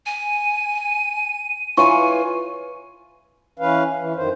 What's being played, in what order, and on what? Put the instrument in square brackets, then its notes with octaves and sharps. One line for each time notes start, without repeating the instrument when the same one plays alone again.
[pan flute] G#5 [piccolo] D#7
[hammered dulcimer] E3 F4 C#5 [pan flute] G#5 [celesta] C#6
[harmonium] E3 C#4 B4 F5
E3
F#2 D#3 C5